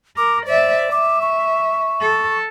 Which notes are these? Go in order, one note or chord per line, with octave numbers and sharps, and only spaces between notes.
A#4 D6
C5 D5 E5
E5 D6
C#6
A4